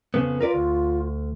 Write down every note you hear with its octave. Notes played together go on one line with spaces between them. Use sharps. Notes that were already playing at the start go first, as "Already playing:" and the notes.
F2 C#3 B3
F4 A#4 B4 D5
D2